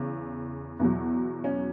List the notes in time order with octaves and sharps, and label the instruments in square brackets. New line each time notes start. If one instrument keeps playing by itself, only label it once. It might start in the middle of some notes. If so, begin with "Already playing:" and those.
Already playing: [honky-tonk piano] E2 C#3
E2 B2 F#3
C#4